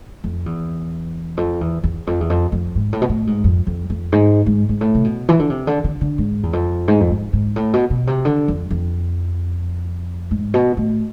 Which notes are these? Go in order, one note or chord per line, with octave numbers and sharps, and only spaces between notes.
F2
E2
F2
E2
E2
F2
E2
F2
F2
G#2
A2
B2
A2
G#2
F2
F2
F2
G#2
G#2
G#2
A2
C3
B2
E3
D3
C3
D3
D3
D3
G#2
E2
F2
G#2
F2
G#2
G#2
A2
B2
B2
C3
D3
F2
F2
G#2
B2
A2